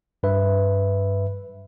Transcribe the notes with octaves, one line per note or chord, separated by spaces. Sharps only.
G2 B4 E5